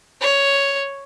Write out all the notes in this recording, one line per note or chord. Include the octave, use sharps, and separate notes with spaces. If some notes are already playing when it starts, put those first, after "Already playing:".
C#5